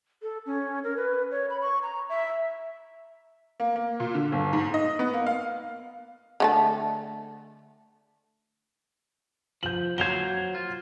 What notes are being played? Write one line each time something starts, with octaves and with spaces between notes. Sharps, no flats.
A4
C#4
A#4
B4
C#5
B5
C#6
A#5
E5
A#3
A#3
A#2
D3
G1
G#2
D#5
B3
A#3
F5
D3 A3 A5
F3 G6 F#7
F#3 A#3 C5 G#6 F7 G7
F4